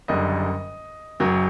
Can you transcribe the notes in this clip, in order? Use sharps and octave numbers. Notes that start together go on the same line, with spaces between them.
F#1 F#2 D3 G3 D#5
F#1 F#2 F#3